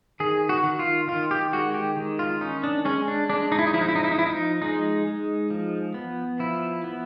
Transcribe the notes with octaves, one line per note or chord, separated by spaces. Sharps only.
D#3 G#4
F#4
D#3
F4
D#3 F4
G4
G#3 F#4
G4
D#3
F4
C#4 D#4
D4
G#3 C#4
D4
G#3 D4
D#4
E4
D#4
F3 E4
D#4
E4
D#4
E4
D#4
F3 E4
D#4
G#3 D#4
G#3
F3
B3
F3 E4
B3